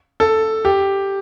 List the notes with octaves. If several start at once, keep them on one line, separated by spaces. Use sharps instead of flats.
A4
G4